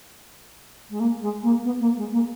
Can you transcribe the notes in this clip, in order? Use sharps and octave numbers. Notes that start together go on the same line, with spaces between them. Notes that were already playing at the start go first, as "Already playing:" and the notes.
G#3
A#3
G#3
A#3
B3
A#3
G#3
A#3